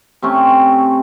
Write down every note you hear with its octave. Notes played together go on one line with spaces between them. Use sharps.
C3 A3 C4 C#4